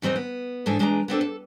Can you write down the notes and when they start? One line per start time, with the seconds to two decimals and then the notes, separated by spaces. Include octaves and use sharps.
0.02 E2 D#3 C4 D#4 D#5
0.16 B3
0.66 G#2 E3 G#3 D4 A4 G#5
0.79 E2 G#3 D4 B4 A5 A#5
1.08 B3 C4 D4 A4
1.21 A4